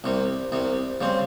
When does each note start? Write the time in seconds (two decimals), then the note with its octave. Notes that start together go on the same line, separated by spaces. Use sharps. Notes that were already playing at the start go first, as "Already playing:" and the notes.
0.04 C2 C3 G3
0.52 C2 C3 G3
1.01 C#3 G3 C4